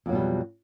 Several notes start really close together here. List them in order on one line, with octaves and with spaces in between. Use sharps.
F2 F#3 B2 G3